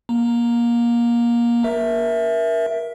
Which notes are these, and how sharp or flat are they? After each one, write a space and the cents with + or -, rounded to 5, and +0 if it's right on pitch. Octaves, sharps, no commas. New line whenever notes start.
A#3 +25 A#5 +0
A#4 +25 E5 +0